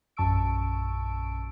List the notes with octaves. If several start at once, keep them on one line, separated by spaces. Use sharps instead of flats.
A#1 F#2 A5 C#6 E6 D7